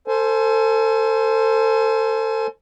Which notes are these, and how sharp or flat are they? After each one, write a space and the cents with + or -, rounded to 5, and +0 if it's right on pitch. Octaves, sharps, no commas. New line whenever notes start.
A4 +30 C5 +0 G#5 +35